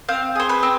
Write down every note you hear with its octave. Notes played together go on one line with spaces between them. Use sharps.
C4 F5
G#4 C5
B4
C4